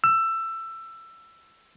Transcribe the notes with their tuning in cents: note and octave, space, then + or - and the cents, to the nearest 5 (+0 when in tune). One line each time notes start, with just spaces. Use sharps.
E6 +20